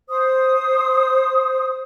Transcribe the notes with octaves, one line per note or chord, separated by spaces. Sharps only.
C5 D#6